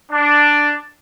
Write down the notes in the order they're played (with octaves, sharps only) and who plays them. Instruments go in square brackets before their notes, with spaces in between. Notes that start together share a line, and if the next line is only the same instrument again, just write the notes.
[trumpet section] D4